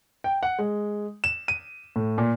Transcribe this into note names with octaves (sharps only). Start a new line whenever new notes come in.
G5
F#5
G#3
E7
D#7
A2
A#2